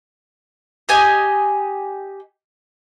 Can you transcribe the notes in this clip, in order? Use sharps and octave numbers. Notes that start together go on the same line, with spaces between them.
G4 D#5 G#5